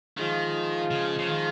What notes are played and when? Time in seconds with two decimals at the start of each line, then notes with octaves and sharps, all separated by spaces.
0.17 D#3 F3 G#3 F4
0.91 C#3
1.19 C#3
1.28 D#3